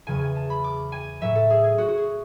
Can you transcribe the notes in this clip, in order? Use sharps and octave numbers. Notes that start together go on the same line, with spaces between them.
E2 C#3 F#3 G#5
G#5
A5
B5
D6
G#5
A2 F#3 E5
A4
G#4
G#4
F#4
F#4
G#4